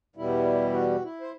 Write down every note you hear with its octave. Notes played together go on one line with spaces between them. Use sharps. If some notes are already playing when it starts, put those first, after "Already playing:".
E2 B2 G3 E4
F#4
E4
C5